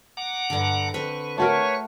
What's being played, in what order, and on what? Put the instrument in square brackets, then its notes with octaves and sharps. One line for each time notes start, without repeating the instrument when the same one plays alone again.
[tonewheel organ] F#5 A#5 D6
[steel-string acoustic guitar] G2 D3
[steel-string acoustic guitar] D3 C4 [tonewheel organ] B4 C#6
[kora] A3 F#4 A#4 [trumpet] C#5